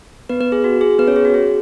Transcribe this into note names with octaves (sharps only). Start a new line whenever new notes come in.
B3 B4
B3 B4
G#4
F#4
G#4
B3 B4
C#4 C#5
G#4
F#4
G#4